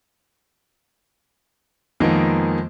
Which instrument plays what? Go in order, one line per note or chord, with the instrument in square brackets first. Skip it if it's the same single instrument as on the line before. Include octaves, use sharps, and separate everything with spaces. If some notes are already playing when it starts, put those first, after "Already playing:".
[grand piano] F2 D#3 G#3 A#3 B3 D#4